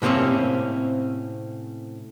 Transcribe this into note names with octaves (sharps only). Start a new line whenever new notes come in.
A2 C3 A#3 C4 C#4